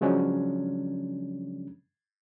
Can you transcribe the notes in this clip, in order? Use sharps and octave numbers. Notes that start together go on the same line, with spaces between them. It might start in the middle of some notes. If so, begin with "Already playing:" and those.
C#3 F3 F#3 G#3 C#4 D4